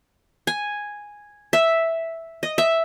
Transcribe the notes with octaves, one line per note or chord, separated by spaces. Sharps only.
G#5
E5
D#5
E5